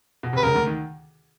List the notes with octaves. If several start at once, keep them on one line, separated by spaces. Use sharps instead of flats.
B2
C3 B4
C#2 C#3 A#4
D2 D3
D#3